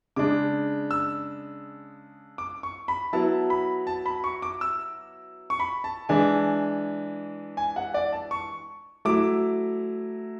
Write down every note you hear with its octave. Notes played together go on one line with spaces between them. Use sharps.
C#3 G#3 D4 D6
E6
D6
C#6
B5
F#3 B3 E4 A5
B5
A5
B5
C#6
D6
E6
C#6
B5
A5
E3 G#3 D4 G#5
G#5
F#5
D5
A5
C#6
F#3 A3 E4 D6